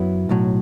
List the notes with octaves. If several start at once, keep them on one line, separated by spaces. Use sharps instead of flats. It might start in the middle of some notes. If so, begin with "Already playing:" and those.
Already playing: F#2 F#3 B3 E4
B1 A2 F#3